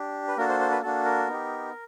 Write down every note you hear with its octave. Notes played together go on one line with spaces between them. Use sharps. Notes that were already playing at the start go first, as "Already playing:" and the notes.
Already playing: D4 G4
B4
A#3 D4 F#4 A4 A#4
C5
C5
B4
A#3 D4 F#4 A4
A#4
B3 D#4 G4